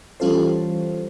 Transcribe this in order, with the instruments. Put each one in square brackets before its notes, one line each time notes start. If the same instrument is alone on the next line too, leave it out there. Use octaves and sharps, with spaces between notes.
[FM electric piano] E3 G3 C#4 F4 A4 C5